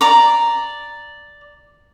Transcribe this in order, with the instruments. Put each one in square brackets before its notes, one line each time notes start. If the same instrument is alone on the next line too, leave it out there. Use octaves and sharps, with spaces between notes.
[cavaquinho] D5 A#5 D6